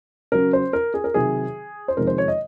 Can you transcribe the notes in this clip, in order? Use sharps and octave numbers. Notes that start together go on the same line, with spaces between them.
C#3 F#3 C#4 A#4
C5
A#4
G#4
A#4
C3 D#3 F#3 C4 G#4
C5
F2 C3 D#3 G#3 A#4
C5
C#5
D#5